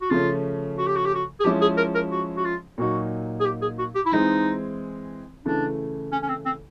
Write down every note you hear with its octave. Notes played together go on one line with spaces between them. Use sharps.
F#4
C#3 F3 A3 C#4 F4
F#4
G4
F#4
G4
F#4
G#4
F3 G#3 C#4 E4 G4
G#4
A#4
A#4
F#4
F#4
F4
A#2 F#3 A#3 D#4 F#4
G#4
G4
G#4
F#4
G4
E4
E3 G#3 C4 D#4
C#3 E3 A3 D4
C#4
C#4
C4
C4